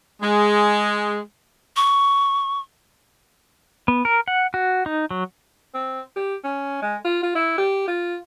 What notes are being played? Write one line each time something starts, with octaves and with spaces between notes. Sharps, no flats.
G#3
C#6
B3
A#4
F#5
F#4
D#4
F#3
C4
G4
C#4
G#3
F4
F4
E4
G4
F4